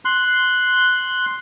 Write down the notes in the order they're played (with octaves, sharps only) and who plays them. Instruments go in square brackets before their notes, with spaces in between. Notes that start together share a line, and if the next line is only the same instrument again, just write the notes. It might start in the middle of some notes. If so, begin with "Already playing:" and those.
[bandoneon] C6 F#6